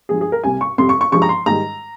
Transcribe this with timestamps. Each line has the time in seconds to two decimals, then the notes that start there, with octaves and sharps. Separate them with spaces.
0.09 G2 F3 G#3 G#4
0.21 G#4
0.32 A#4
0.44 C2 C3 G3 G#5
0.61 C#6
0.78 F2 C3 G3 C6
0.89 C#6
1.01 C#6
1.12 G2 F3 G#3 C#6
1.22 A#5
1.29 C6
1.46 G#2 D#3 G3 A#5